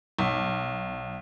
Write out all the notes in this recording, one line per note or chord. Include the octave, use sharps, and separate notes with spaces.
B1